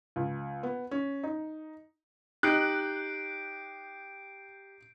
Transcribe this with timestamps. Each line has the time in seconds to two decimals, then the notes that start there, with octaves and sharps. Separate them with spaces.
0.16 C#2
0.63 B3
0.91 C#4
1.24 D#4
2.43 D#4 G4 D#5 F#6 G6 C7 D7